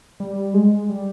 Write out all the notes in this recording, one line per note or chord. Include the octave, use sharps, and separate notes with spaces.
G3
G#3
G3